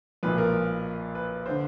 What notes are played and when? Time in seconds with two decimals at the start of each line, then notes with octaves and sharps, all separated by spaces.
0.23 B1 A#2 F3 B4
0.38 A#4
1.15 B4
1.46 D3 C5